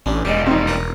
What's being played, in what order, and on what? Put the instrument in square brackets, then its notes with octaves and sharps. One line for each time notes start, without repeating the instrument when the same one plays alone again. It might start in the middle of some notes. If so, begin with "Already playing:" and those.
[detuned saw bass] A1 [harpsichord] C#4 D4
[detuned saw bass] E1 [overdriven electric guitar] A#2 G3 [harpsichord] G#3 G4
[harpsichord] F2 [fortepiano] C4 D#4
[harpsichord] A#4 B4 C#5